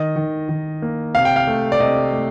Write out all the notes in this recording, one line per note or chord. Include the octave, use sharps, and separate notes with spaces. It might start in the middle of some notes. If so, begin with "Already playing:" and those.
Already playing: D#3 D#5
D#3
D#3
A#3
C3 F5
G5
F5
A3
D5
C3 D#5
A3